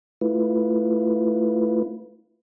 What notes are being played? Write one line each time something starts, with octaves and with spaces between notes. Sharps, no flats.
A3 E4 F4 B4